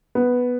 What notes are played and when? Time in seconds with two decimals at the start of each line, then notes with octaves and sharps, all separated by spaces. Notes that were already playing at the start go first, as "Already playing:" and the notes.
0.15 B3